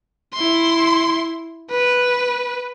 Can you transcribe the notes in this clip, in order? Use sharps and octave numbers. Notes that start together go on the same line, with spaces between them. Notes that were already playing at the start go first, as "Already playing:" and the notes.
E4 C6
B4